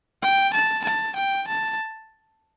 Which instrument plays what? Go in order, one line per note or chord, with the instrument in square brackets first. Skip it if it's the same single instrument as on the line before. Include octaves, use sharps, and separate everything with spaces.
[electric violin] G5
A5
A5
G5
A5